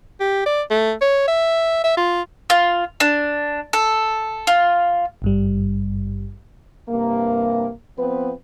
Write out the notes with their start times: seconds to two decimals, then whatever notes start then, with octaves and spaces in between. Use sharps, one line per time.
0.20 G4
0.46 D5
0.70 A3
1.01 C#5
1.28 E5
1.84 E5
1.97 F4
2.50 F4
3.00 D4
3.73 A4
4.47 F4
5.22 G#1 G2 G3
6.89 G2 C3 A#3
7.98 F3 B3 C4 B4